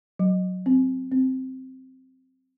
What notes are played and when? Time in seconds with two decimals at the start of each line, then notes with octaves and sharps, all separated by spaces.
0.19 F#3
0.66 C4
1.12 C4